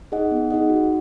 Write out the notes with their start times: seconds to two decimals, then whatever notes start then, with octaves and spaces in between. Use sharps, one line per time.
0.12 D#4 G#4 D#5 F#5
0.31 B3
0.51 D#4 G#4 D#5 F#5
0.70 F#4